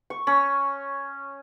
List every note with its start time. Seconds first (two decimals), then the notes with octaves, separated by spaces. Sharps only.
0.10 C#6
0.27 C#4